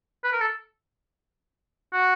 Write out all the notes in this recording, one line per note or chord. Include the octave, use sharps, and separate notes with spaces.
B4
A#4
A4
F#4